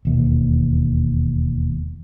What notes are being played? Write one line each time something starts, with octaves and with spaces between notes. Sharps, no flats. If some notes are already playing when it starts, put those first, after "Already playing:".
E1 D#2